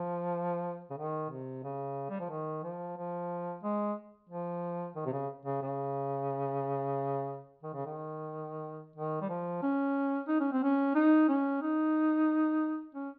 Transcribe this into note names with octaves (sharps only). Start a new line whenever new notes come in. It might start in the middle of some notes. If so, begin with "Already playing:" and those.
Already playing: F3
C#3
D#3
C3
C#3
G3
F3
D#3
F3
F3
G#3
F3
D#3
C3
C#3
C#3
C#3
D#3
C#3
D#3
D#3
G3
F3
C#4
D#4
C#4
C4
C#4
D#4
C#4
D#4
C#4